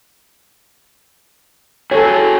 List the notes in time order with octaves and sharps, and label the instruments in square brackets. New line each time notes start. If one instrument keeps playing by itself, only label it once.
[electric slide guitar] F#4 G#4 [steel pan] A4 C#5